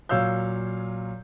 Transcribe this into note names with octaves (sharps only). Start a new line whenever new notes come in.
A#2 F#3 C#5 F5 E6 G6